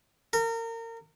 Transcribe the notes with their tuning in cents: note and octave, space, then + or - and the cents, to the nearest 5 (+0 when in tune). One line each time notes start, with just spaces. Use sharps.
A#4 -30